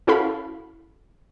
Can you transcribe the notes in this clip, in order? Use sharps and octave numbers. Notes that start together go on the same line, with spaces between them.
C#4 E4 F#4 A4 F5 B5